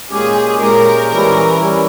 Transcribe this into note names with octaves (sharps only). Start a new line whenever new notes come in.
A#2 G#3 C#4 G4 G#4
A#2 G#3 C#4 G4 A#4
E3 G3 C#4 E4 A#4
E3 G3 C#4 E4